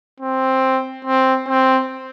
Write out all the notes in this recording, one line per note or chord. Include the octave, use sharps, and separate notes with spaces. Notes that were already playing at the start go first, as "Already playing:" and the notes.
C4
C4
C4